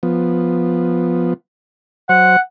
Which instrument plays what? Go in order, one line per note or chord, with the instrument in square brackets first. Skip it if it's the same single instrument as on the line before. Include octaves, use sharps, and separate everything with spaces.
[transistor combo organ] F3 B3
[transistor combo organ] F#3 C5 [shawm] F#5